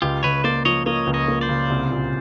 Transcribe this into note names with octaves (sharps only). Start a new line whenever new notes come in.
C#2 F4 G4
C#2 B4 C#5
A#3 C5 D5
F3 C#5 D#5
A#3 C#5 D#5
C#2
C#5 D#5
A#3
C5 D5
C#3
C2
A#2